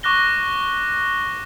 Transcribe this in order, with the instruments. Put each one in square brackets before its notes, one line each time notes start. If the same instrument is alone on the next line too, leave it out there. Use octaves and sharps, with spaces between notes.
[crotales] C#6 D6 F#6 A#6 G7